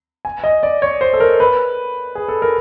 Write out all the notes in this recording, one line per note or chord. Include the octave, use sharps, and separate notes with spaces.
G#5
D#5
D5
C#5
C5
A4
A#4
B4
G#4
A4
A#4